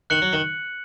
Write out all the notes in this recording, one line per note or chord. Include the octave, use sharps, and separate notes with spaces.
D#3 F#6 C#7 F#7
F#3
D#3